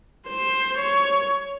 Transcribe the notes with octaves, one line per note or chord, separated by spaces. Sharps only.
C5
C#5